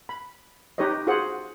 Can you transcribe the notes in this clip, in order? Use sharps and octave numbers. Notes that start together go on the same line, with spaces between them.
B5
D#4 G4 B4 C#5 D#5
F4 F#4 G#4 C5 F#5